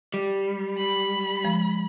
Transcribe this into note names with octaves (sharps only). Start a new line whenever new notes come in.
G3
B5
F3 G#3